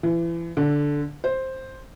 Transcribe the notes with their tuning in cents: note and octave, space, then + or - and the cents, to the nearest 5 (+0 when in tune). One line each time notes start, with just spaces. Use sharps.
E3 +35
D3 -10
C5 +5